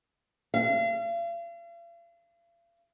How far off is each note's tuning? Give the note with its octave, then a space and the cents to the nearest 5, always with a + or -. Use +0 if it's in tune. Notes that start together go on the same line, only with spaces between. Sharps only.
F5 -40